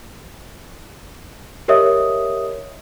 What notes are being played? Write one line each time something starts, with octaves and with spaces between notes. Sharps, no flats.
G4 A#4 C#5 D#5 E5 D#6